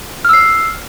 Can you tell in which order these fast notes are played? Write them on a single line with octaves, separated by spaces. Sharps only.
F6 E6 C7